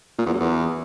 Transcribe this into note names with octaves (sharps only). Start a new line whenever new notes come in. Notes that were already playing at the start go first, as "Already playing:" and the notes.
A#2
E2
F#2
E2